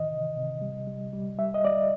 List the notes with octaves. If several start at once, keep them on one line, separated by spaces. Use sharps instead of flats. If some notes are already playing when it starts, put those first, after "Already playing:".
Already playing: A2 D#3 E3 D#5
C3
C3
G3
G3
G3
G3 E5
D#5
G3 D5